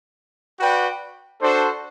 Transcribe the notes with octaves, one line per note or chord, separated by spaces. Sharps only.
F#4 B4 D5 G5
D4 F#4 A4 C5